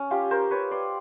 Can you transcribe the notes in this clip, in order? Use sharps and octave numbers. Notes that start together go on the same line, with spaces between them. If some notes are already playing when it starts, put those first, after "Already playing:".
Already playing: C#4
F4 G4
A#4 C5
B4 C#5
C5 D5